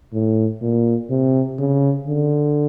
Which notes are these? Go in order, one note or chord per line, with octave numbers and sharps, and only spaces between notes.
A2
A#2
C3
C#3
D3